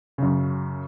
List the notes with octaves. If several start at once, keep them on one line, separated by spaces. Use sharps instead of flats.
F#2 C#3